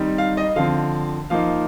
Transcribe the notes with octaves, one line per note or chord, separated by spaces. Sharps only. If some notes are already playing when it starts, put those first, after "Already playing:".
Already playing: D#3 G3 C4 D#4
F5
D#5
D3 F3 C4 F5
F3 A#3 D#4 F5